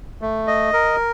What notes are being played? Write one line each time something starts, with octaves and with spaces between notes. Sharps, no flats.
A3
D#5
A#4